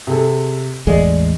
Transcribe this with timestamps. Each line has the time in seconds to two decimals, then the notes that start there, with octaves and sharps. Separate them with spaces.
0.07 C3 G#4 A4
0.87 A1 E2 G#3 G#4 D5 D#5